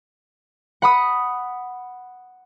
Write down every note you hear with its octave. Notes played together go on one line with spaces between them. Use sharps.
F#5 B5 D#6